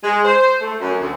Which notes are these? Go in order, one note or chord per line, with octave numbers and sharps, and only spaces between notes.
G#3
C5
A3
F#2
D2